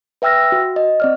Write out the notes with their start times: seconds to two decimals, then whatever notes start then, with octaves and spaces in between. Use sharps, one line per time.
0.22 B4 E5 G5 E6 F6 A#6
0.52 F#4
0.76 D#5
1.00 C4 D5 F6